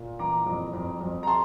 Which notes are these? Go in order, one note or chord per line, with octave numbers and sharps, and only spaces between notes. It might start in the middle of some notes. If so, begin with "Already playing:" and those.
Already playing: A#2
E3 A#5 D6
F2
F2
F2
A#5
A5 C6